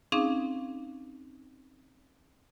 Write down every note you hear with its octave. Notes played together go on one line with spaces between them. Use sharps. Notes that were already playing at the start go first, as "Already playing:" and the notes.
C4 C#4 D#4 G#4 F5 D6